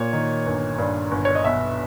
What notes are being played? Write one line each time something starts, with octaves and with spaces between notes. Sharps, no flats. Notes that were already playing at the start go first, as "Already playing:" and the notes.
Already playing: A#2 C#5
D#3
G1
G2
G1
C#5
D#5
B1 E5